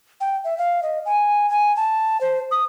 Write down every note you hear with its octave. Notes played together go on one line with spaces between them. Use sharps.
G5
E5
F5
D#5
G#5
G#5
A5
C5
D#6